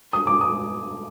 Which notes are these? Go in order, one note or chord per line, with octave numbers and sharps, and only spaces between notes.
D#6
D6
D#6